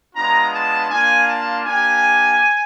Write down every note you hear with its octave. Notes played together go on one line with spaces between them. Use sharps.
G#3 B3 D4 F4 A#5
A5
A#3 D4 F4 G#5
A5
A#3 D4 G4 G#5